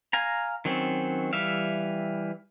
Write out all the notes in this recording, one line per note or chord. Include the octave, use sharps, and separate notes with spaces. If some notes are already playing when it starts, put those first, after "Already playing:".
F5 G#5 A#5
D#3 F#3 C4 C#4
E3 G3 E5 F5